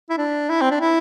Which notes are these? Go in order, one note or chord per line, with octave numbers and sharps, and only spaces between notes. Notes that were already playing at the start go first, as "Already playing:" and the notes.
E4
D4
E4
C4
D4
E4